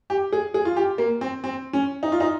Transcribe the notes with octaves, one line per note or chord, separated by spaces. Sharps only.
G4
G#4
G#4
F4
G4
A#3
C4
C4
C#4
D#4
F4
D#4